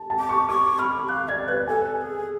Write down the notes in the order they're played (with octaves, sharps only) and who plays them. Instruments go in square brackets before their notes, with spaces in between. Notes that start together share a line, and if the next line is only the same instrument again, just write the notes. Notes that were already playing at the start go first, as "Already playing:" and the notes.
Already playing: [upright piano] A5
A5
[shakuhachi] D6
[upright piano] C#6
[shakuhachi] C#6 [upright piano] D6
[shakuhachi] B5 [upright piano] F6
[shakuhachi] F5 [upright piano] F#6
[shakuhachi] D5 [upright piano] G#6
[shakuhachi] B4 [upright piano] F#6
[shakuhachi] A4 [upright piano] G#5
[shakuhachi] A4
G#4